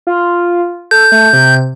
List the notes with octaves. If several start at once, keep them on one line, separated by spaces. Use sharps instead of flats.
F4
A4 G6
A3
C3